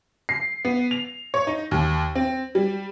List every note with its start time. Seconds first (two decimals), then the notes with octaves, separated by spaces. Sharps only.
0.29 C7
0.65 B3
0.91 F7
1.34 C#5
1.47 D#4
1.71 D#2
2.15 C4
2.55 G3